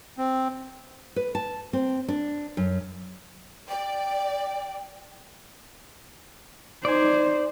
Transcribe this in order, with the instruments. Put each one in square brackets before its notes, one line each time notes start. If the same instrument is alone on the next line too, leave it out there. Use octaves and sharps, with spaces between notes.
[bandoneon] C4
[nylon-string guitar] B4
A5
C4
D4
F#2
[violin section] D5 [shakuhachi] G5
[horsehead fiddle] D#4 C5 [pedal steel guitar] D5 G#5